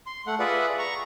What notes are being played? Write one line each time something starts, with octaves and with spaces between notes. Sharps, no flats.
C6
A3 F#5
F4 G#4 B4 D5 E5 F#5
A#5 C#6